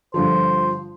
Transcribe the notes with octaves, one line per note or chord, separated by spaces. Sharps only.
G2 D3 F3 C5